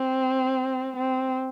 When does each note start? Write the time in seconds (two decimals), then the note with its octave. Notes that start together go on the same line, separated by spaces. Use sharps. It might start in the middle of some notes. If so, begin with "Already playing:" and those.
Already playing: C4
0.96 C4